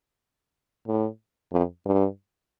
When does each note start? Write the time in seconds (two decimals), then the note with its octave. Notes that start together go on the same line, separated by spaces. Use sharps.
0.87 A2
1.53 F2
1.86 G2